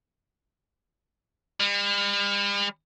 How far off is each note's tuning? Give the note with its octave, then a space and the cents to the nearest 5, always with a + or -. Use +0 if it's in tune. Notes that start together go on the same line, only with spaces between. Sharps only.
G3 +45